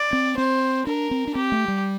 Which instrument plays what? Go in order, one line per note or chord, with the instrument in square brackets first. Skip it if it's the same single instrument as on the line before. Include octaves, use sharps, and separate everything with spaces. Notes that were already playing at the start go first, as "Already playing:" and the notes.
Already playing: [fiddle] D5
[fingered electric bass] C4
[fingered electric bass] C4 [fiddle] C5
[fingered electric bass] D4 [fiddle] A#4
[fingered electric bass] C4
D4
[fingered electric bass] C4 [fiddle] G4
[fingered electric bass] A3
G3